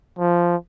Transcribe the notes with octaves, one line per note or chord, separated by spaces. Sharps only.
F3